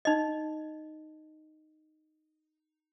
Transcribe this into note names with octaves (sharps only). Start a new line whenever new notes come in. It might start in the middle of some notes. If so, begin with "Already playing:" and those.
D#4 D#5